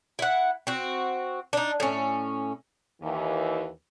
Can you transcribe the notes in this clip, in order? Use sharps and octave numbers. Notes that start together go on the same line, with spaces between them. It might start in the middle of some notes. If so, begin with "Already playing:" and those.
E4 F#5
C4 F#4
D4 D#4
A2 C#4
D#2 E3